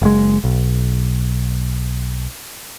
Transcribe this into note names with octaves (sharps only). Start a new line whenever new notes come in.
F#1 G#3
B1